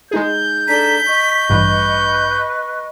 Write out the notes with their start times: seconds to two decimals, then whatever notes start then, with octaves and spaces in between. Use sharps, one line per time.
0.11 G#3 D#4 G#4 G6
0.68 D4 A4 A#5 B6
1.06 D#5 C#6
1.49 A1 G2 B4